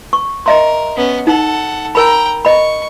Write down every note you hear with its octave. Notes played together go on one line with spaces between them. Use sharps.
C#6
A#4 D#5 E5 C6
B3 C#4
D#4 A4 F#5
A#4 G5 A#5 B5
D#5 B5 C#6